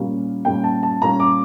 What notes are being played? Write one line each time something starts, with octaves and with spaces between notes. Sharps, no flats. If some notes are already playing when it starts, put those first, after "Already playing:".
Already playing: A#2 G3 A#3 C#4
A#2 G3 A#3 C#4 G5
A5
A5
A#2 G3 A#3 C#4 A#5
D6